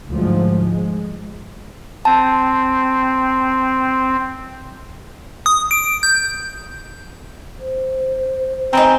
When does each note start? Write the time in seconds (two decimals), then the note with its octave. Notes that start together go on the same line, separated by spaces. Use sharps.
0.11 D2 G#2 F3 F#3
0.62 G#3
2.05 C4 A5
5.46 D#6
5.71 D7
6.03 G6
7.60 C5
8.73 G#3 B3 C4 D#4 G#5 A#5